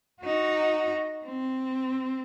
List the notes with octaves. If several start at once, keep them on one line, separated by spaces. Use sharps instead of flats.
D#4 F#4
C4